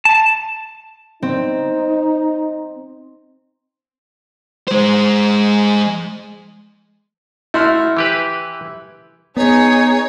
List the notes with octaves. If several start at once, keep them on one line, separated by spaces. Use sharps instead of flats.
A5
C4 D#4
G#3 C5
A3 E4 F#4 C6 F6
E3 G4 B4
B3 D#4 G#4 C#5